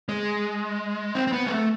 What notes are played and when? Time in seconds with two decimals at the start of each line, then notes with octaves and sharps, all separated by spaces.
0.09 G#3
1.15 C4
1.27 C4
1.32 B3
1.46 G#3
1.51 A3